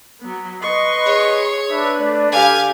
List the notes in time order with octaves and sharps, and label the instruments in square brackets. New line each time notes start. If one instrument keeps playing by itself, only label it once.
[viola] F#3 B3
[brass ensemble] B4 D#5 [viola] C6 C#6
[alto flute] G#4 [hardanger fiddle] C#5
[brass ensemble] D4 B4 [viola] E5
[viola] A3 [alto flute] D5
[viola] D3 G4 [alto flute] A4 [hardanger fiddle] F5 G#5